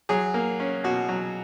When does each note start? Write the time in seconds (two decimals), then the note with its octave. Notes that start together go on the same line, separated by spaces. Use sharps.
0.09 F#3 G#4
0.34 A#3
0.60 C#4
0.84 B2 F#4
1.09 F#3